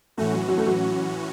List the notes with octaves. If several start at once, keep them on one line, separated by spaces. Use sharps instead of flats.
A2 E3 A3 C#4 F#4
F#3
F#3
A3
F#3